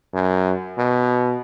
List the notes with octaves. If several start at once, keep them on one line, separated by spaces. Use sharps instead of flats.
F#2
B2